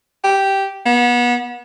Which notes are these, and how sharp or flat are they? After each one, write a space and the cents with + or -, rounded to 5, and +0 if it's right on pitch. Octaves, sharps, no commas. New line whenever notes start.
G4 -5
B3 -30